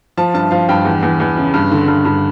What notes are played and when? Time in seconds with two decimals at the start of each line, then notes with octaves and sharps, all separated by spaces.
0.17 F3 A5
0.34 G2 A5
0.51 F3 F5
0.69 G2 G5
0.85 E2
1.03 E2
1.20 E2
1.37 C#3
1.54 G2
1.72 D3
1.88 G2
2.05 G2